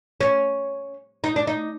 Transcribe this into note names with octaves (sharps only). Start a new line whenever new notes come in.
C#4
D#4
D4
D#4